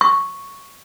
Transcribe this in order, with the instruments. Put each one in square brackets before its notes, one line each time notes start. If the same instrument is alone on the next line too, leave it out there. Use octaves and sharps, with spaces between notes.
[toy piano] C#6